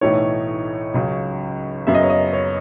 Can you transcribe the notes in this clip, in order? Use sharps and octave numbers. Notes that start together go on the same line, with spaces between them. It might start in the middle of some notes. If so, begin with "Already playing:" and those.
B1 A2 E3 A3 D#4 C#5
C#2 C#3 F#3
F#1 F#2 C#3 F#3 B3 E5
D#5
C#5
D#5
C#5